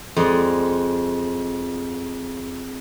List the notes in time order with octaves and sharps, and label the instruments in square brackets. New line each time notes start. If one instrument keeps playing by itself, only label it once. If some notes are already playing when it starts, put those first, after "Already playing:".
[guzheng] F2 G#3 D5 D#5